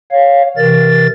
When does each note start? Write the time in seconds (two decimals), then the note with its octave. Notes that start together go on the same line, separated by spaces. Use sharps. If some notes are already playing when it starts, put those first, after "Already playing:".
0.11 C#5 F5
0.57 C3 E3 A#4 A6